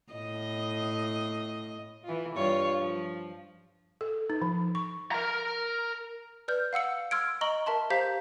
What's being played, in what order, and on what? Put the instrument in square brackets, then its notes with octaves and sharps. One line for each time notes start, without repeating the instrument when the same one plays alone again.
[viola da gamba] A2 D#5
E3 F4
G2 F4 C#5
F3
[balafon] A4
D#4
F3
C#6
[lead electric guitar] A#4 A#5
[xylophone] B4 D5 F6 G6
F5 F#5 E6 C#7
C6 E6 F6 G#6 D7
D#5 A#5 C#6 F#7 G7
A#4 E5 A5 C6
G4 C5 F5 A#5 G6 B6